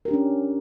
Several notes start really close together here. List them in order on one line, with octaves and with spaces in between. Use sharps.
A#4 G4 D4 C#4